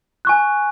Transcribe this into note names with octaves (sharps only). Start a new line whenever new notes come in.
G#5 C#6 F#6